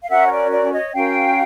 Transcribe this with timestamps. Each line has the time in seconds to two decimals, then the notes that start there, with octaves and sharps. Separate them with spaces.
0.03 F5
0.09 C#4 F#4 A#4 E5 F#5
0.26 C#5
0.31 D5
0.52 D5
0.73 C#5 D#5
0.94 C#4 F#4 A#4 F5 G5